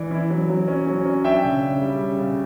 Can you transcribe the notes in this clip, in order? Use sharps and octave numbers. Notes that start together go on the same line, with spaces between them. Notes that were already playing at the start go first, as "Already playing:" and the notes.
Already playing: E3 D5
E4
F#3
F#3
C#4
F#3
C#4
D4 E5 G5
C#3
C#3
G3
C#3
C#3